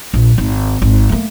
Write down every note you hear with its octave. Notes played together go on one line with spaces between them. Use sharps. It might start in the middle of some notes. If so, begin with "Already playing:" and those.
A#1
G#1
G#1
A3 A#3